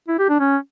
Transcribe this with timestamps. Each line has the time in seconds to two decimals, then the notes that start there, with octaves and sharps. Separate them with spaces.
0.08 E4
0.19 G4
0.29 D4
0.40 C#4